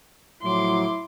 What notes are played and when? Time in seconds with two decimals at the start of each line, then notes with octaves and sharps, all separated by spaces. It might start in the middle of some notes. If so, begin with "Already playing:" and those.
0.43 A2 F3 F#3 E4 C6 D6